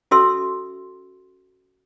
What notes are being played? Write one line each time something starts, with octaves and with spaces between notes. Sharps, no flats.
C#4 F#4 A4 E5 C6 E6